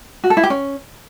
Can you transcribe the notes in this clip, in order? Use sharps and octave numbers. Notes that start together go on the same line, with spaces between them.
F#4
A4
E4
G4
C#4